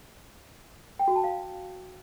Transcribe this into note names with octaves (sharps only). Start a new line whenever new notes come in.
G5
F#4
A5
F5